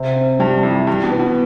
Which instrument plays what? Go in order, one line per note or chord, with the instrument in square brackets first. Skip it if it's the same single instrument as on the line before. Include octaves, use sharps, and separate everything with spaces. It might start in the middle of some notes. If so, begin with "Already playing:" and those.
Already playing: [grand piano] C3
C4
[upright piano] G2 [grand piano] G3
[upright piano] F2 [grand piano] E4
[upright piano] G2 [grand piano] E3
[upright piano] B2
[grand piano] B3
[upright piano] B2